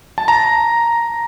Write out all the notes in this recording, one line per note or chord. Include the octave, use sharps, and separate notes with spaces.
A5
A#5